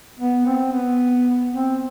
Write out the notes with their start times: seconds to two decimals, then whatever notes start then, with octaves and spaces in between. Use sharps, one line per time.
0.20 B3
0.46 C4
0.72 B3
1.52 C4